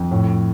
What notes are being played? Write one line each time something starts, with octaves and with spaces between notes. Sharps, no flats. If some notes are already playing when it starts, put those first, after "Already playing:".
Already playing: F2
A2